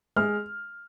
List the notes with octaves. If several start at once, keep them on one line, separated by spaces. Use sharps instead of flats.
G#3 F6